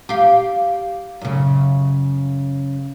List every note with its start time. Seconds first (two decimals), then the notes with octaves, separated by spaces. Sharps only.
0.09 G4 F5
1.21 F#2 C#3